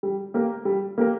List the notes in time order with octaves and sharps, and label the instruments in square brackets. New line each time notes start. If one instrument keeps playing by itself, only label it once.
[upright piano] G3
A#3 G4 A#4
G3
A#3 G4 A#4